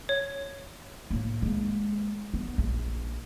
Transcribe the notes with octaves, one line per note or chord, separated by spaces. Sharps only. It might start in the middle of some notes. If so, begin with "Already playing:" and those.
C#5
A2 A#3
G#3 A#3
B3
A#1